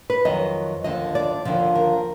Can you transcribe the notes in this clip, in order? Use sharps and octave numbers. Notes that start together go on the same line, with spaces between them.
B4
F2 D#3 F#3 D#5
D#2 D3 F3 D#5
D5
D#2 D3 F3 D5
A#4